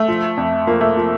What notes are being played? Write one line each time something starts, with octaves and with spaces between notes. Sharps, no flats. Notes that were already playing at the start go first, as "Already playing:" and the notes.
Already playing: A3
F3
F2
F3 A#3
A3
F3